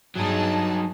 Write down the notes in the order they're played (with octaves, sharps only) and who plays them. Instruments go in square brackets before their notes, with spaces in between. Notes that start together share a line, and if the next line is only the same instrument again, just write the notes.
[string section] G2 G#4 A5 [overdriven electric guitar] F#3 D#4